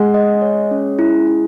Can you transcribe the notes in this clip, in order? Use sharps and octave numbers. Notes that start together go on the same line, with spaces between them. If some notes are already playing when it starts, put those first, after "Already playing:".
Already playing: G#3 F#5
D#5
C#5
C#4
E4
E4